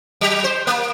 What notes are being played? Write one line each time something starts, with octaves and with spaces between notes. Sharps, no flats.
F#3
C5
A#3